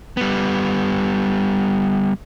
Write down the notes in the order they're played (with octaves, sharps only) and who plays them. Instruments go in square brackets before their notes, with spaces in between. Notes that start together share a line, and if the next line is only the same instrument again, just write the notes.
[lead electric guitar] G3 B3